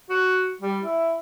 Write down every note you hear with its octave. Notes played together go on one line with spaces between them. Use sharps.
F#4
G3
E4